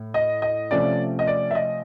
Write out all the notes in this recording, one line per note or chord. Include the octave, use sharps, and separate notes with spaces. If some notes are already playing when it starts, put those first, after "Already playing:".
Already playing: A2
D#5
D#5
C3 F3 A3 C#4 D5
D#5
D5
E5
D#5